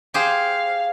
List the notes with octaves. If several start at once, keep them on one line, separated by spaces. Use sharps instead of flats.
G4 G#4 C5 F5